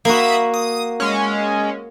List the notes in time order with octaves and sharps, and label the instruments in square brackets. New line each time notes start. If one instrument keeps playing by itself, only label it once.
[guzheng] A#3 F#4 [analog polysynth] E5 B5 D#6
[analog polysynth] D#6
G#3 C#4